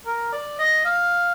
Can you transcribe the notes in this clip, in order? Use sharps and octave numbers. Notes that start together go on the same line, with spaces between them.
A#4
D5
D#5
F5